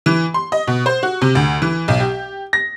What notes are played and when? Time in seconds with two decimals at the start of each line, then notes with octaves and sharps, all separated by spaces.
0.06 E3
0.34 C6
0.52 D#5
0.68 B2
0.86 C5
1.03 F#4
1.22 C3
1.35 D2
1.62 E3
1.88 B1
2.00 G4
2.53 A#6